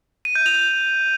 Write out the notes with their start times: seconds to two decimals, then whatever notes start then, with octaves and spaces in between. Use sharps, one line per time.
0.25 D#7
0.35 G6
0.46 F7